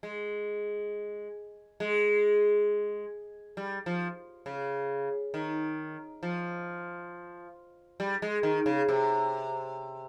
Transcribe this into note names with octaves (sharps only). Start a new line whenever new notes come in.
G#3
G#3
G3
F3
C#3
D#3
F3
G3
G#3
D#3
C#3
C3